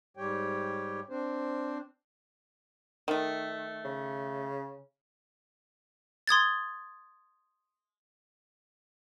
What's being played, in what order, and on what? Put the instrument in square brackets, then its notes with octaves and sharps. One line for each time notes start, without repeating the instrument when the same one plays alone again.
[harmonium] G#2 G3 G4 C#5 G5
C4 D4 C5
[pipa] D#3 A3
[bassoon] C#3
[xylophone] C6 D#6 G#6 A6